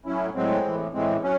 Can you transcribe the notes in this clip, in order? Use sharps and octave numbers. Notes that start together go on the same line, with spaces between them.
A2 F#3 C#4 E4
A2 F#3 G#3 C4
A2 E3
A2 E3 G#3 C4
F#3 C#4